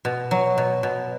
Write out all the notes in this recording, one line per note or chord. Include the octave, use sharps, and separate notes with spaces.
B2
F#3
B2
B2